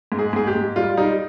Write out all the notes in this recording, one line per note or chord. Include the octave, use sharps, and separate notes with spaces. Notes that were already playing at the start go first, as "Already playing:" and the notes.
G#2
G#4
G#2 G#4
G4
G#2
G3 F4
G3 D#4